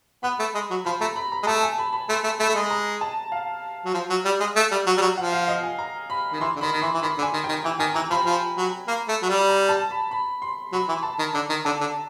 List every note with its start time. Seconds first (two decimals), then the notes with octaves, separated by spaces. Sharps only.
0.23 B3 B5
0.39 A3
0.54 G#3
0.70 F#3
0.85 F3 B5
1.00 A3 A#5
1.16 B5
1.32 A#5
1.43 G#3
1.46 A3 A5
1.63 G#5
1.78 B5
1.93 B5
2.09 A3 C6
2.24 A3
2.39 A3 B5
2.49 A3
2.55 G#3
2.70 A#5
3.01 A5
3.32 F5
3.85 F#3
3.94 F3
4.09 F#3
4.25 G3
4.40 G#3
4.56 A3
4.71 G3
4.86 F#3
4.98 G3
5.01 F#3
5.17 F3 F#5
5.33 F5
5.48 D#5
5.63 G#5
5.79 A#5
6.10 B5
6.32 D#3
6.40 E3 C6
6.56 D3
6.61 D#3 B5
6.72 D#3
6.82 E3 C6
6.93 E3
7.02 D#3 B5
7.18 D3
7.22 G#5
7.33 D#3
7.44 D#3 G5
7.64 E3 G5
7.79 D#3 G#5
7.94 E3 A#5
8.10 F3 B5
8.26 F3
8.56 F#3
8.87 A#3
9.08 A3
9.22 F#3
9.29 G3
9.49 A#5
9.69 A5
9.91 B5
10.11 B5
10.42 C6
10.72 F#3 B5
10.88 E3
11.03 A5
11.19 D#3
11.34 D3 A#5
11.49 D#3
11.65 D3 A5
11.81 D3